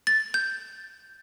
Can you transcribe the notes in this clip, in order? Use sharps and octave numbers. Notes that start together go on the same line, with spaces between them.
A6
G6